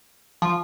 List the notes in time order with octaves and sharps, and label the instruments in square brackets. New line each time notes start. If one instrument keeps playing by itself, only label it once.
[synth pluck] F3